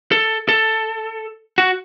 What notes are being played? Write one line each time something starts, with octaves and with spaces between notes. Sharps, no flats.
A4
A4
F#4